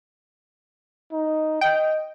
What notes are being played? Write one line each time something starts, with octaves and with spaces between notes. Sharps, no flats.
D#4
D#5 G5